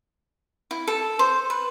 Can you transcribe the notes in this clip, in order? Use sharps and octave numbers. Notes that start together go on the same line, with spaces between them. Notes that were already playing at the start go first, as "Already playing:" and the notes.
E4
A4
C5
B4